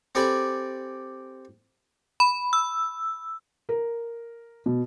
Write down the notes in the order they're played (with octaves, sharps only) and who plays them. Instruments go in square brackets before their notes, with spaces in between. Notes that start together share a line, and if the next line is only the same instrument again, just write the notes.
[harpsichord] C4 G4 A4 D5 G#5 B5
[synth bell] B5
E6
[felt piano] A#4
B2